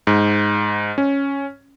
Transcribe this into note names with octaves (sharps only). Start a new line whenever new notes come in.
G#2
C#4